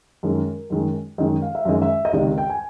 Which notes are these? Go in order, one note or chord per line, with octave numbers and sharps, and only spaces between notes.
F#2 D#3 G#3 A#4
F#2 D#3 G#3
F#2 D#3 G#3 D#5
F5
E5
F#2 D#3 G#3 D#5
E5
D#5
C#2 C3 D#3 D5
G5
G#5